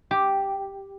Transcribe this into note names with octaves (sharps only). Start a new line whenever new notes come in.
G4